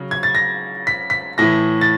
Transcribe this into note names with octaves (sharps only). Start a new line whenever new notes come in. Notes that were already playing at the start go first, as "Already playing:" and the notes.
Already playing: C#3 F#3
G#6
A6
A#6
B6
B6
A2 E3 A#6
A6